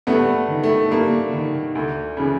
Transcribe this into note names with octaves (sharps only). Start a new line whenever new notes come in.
G2 A3 B3
D#3
A3
G2 A#3
D#3
D2
C#3 E3